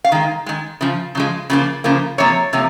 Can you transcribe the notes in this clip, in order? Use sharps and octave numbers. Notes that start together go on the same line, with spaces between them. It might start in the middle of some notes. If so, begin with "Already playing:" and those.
F5
D#3 G#3
D#3 G#3
C#3 F3
C#3 F3 G#3
C#3 F3 A#3
C#3 F3 A#3
C3 F3 A#3 C#5
C3 F3 A#3